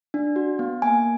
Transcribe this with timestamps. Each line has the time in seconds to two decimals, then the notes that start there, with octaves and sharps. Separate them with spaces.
0.14 D4
0.36 F#4
0.59 B3
0.82 A#3 G#5